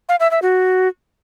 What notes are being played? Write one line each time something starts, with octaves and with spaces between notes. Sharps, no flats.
F5
E5
E5
F#4